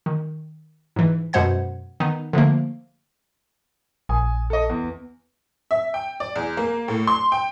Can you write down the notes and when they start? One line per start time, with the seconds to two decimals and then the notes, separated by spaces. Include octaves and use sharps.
0.06 D#3
0.96 G#2 E3
1.33 F#2 B2 G#3 C5 F#5 G#6
2.00 D#3 B3 D#4
2.33 D3 F3 A3 A#3
4.09 A#1 G#5 D#6
4.50 A4 D#5
4.69 E2
5.71 E5
5.94 G5
6.20 D5
6.36 E2
6.57 A#3
6.88 A2
7.07 C6
7.32 G5